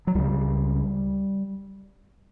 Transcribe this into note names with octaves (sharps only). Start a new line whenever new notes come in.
F#3
C#2 C#3 G3